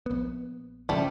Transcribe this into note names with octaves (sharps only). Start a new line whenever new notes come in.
A#1 B3
F#2 C#3 F3 G3 A3